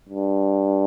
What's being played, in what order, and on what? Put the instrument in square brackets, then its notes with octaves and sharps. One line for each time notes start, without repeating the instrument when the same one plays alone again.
[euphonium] G2